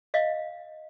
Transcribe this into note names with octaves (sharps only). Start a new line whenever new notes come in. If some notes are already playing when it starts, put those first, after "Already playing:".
D#5 F5